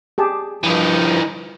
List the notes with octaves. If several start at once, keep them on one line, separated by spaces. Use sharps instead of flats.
G4 G#4 A5
G2 E3 F3 D#4